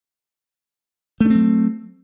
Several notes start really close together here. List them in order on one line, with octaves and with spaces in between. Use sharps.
A3 D4 C4 F#3